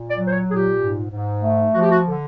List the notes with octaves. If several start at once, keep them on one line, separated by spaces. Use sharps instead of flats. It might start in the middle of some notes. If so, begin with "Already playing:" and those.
Already playing: A#2
D5
F#3
C5
C#5
A#2 G#4
G4
G#2
G#2
A3
F3 F#4
G4
F#4
D3